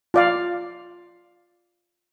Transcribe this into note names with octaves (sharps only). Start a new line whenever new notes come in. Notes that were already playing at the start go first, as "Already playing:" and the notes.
F4 D5 F5